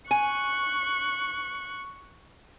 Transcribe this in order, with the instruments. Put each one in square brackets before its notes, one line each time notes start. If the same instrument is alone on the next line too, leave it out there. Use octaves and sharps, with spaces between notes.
[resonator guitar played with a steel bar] G#5 [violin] C#6 F#6